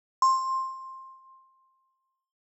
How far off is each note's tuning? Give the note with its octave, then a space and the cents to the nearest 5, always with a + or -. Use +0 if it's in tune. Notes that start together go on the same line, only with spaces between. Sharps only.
C6 +15